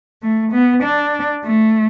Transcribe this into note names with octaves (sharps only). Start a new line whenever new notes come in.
A3
B3
D4
A3